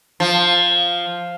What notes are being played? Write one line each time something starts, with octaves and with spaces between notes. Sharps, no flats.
F3